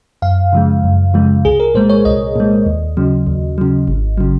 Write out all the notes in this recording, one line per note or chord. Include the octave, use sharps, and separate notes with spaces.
F#2 F5
C#3 F3 G#3
F#2
C#3 F3 G#3
C2 G#4
A#4
A#2 G#3 C5
C#5
C2 D#5
A#2 G#3
D#2
C#3 F#3
D#2
C#3 F#3
G#1
C#3 F#3